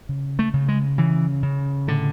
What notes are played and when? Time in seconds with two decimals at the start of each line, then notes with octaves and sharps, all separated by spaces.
0.09 C#3
0.39 A3
0.54 C#3
0.68 G#3
0.98 C#3 E3
1.43 C#3
1.87 A2 D3